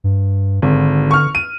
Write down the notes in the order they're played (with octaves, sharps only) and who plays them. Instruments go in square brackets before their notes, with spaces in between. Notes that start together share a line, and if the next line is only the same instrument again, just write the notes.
[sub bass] G2
[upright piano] G#1 [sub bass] D3
[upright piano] C#6 F6
D#7